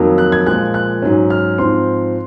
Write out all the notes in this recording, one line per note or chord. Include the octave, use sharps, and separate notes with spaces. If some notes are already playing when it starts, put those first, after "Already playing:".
Already playing: F2 D#3 F#3 A#3
F#6
G#6
A#2 F3 G#3 F#6
F#6
G#2 F#3 C#4
F6
G#2 F3 C4 C6